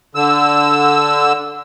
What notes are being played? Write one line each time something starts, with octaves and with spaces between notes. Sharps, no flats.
D3 E6